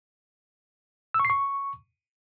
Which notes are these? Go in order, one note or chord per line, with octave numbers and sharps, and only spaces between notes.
E6
C#6
C7
C#6